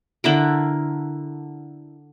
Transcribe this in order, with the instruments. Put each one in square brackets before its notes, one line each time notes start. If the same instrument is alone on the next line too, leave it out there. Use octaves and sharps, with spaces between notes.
[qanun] D3 E4 A#4